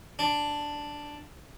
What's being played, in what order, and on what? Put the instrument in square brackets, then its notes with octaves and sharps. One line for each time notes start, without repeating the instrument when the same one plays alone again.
[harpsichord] D4